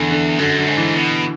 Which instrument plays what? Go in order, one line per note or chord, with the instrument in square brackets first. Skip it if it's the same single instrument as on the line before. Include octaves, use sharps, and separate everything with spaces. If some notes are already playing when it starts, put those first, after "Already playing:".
Already playing: [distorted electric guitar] E2 [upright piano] D3
[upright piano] D3
[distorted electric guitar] F#2 [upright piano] D3
[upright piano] D3
[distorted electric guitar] G#2
[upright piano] E3
[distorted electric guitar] B2